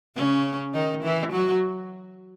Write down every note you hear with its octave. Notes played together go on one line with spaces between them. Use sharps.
C#3 C#4
D#3 D#4
E3 E4
F#3 F#4